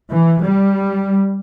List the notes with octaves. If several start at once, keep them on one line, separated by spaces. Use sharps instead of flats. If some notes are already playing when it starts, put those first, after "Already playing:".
E3
G3